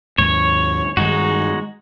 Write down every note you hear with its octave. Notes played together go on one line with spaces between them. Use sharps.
D#2 G#2 C#5
G2 D#3 G#3 D#4 F#4